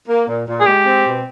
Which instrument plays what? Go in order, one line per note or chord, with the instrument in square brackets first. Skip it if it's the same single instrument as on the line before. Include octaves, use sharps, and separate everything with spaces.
[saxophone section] A#3
A#2
A#2
[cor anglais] G#4
[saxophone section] G#3 [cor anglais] G4
[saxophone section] C4
B2